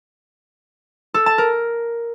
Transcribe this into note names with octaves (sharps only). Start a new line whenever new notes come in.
A4
A5
A#4